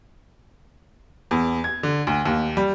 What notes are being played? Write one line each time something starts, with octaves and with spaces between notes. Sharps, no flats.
E2
G#6
D3
D2
D#2
G3